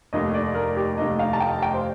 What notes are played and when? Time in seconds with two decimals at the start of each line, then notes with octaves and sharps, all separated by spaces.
0.13 F1 D#2 D#3 A3 D4 D#5
0.34 D5
0.55 A#4
0.77 G4
0.98 F1 D#2 D#3 A3 D4 D#5
1.19 F5
1.33 A5
1.40 G5
1.62 G5
1.74 C5